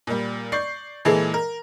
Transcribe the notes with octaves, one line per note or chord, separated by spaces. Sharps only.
A#2 G3
D5 C#6 G6 C7
A#2 E3 G#3 G#4 A4
A#4